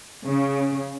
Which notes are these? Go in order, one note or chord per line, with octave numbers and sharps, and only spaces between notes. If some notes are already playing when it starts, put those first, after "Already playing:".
C#3